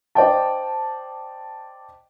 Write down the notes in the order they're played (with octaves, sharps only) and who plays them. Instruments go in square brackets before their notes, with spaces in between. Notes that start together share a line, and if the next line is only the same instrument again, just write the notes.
[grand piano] C5 D5 D#5 G5 A5